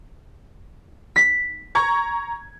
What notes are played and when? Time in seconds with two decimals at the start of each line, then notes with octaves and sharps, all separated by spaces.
1.16 B6
1.75 A#5 C#6 G#6